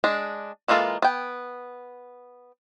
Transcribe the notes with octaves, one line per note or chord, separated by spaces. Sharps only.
G#3 D4
E3 G#3 A#3 F4 A4
B3 G5